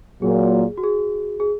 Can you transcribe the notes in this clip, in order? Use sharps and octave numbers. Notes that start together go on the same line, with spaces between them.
A#2 F#3 A#3 G#4
F#4
G#4
G#4